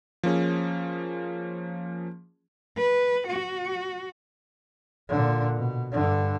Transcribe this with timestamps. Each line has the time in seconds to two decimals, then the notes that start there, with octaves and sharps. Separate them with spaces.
0.23 F3 A#3 C#4 G#4
2.77 B4
3.27 F#4
5.09 A#2 D3
5.55 B2
5.92 G2 D3